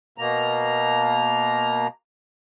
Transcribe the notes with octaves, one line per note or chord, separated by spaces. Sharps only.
B2 A#3 A#5